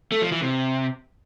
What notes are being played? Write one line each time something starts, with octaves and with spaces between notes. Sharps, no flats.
A3
F3
E3
C3